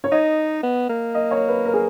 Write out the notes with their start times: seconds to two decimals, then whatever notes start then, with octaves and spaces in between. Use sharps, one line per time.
0.04 C#5
0.11 D#4 D#5
0.63 B3
0.89 A#3
1.14 D#5
1.31 C#5
1.49 B4
1.65 A#4
1.73 G#4